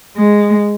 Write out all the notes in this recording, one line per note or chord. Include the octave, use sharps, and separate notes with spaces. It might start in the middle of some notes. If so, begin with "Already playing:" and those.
G#3